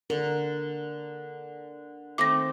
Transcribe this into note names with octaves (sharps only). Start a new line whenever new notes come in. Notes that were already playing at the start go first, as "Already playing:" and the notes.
D3 A#4
D#3 A3 C4 D6 A#6